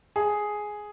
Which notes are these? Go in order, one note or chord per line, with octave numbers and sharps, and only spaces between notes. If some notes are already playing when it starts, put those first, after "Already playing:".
G#4